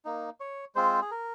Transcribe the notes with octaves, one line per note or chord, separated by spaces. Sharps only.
A#3 D#4
C#5
G#3 C4 F4 C5
G#4
A#4